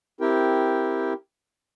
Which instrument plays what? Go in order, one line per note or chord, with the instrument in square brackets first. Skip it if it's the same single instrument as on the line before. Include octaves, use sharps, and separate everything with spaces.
[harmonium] C4 E4 G4 A#4 G5